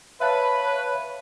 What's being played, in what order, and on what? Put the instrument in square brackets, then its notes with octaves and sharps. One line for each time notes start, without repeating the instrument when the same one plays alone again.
[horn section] B4 [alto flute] C#5 [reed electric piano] E5 F5 A5